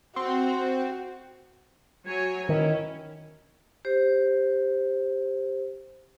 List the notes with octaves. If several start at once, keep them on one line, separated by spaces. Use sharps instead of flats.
C4 F#4
F#3 C#5 G#5
D#3 C#4 E4
G4 C5